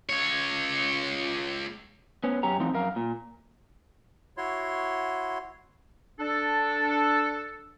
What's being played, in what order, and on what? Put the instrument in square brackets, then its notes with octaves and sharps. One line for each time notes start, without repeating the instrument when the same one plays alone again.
[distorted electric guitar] C#2 C#5
[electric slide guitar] B3 C#4
F#2 C#4 G4 A#5
E3 F3 C4 D#4
F#2 A#4 F5
A#2
[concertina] E4 F#4 C#5 C6
[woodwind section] D4 A4